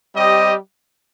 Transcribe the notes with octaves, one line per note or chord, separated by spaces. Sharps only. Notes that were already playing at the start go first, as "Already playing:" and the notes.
G3 C4 G4 D#5